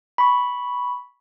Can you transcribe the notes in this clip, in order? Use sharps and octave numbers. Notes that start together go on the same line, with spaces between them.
B5 C#6